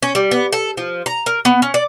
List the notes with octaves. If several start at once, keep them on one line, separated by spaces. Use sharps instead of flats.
C#4
G3
B3
A4
F3
A#5
A#4
B3
C#4
D5